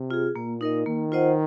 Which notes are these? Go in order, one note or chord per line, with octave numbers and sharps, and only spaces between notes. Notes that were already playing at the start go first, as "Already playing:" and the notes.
Already playing: C3
F4 G#4
A#2 A#3
D#4 A#4 D#5
D#3 A#3
F4 C5 D#5 F#5